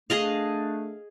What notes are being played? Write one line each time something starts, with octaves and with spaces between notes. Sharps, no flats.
A3 D4 G#4 D#5 F5